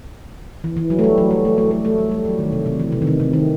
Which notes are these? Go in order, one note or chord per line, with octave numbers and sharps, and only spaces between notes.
E3
E3
F#3
A3
G3
F#3
G3
A3
A3
A3
A3
G3
G3
F#3
D#3
C3
C3
E3
C3
D#3
C3
C3
D#3